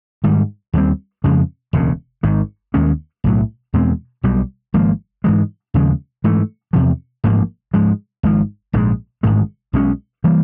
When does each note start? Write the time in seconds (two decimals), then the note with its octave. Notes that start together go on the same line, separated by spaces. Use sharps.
0.24 G#2 D#3 G3
0.73 D#2 D3 G3 C4
1.24 F2 C#3 F3 G#3
1.73 E1 D2 C#3
2.23 G#1 G#2 D#3
2.74 D#2 D#3 G#3 C#4
3.24 B1 A2 F#3
3.74 E2 B2 G#3 C4
4.23 B1 B2 G3
4.74 G#1 G#2 F3 A#3
5.24 G#2 E3 G#3
5.74 D#2 C#3 F3 G#3
6.24 G#2 E3 A3
6.73 E2 C3 F3
7.24 A1 G#2 F3 A#3
7.74 G#2 F3 G#3
8.23 G#1 G#2 F3
8.73 A#1 G#2 F3 G#3
9.23 A1 G#2 D#3 G#3
9.73 B1 B2 G#3 C#4
10.24 E3 G3 A#3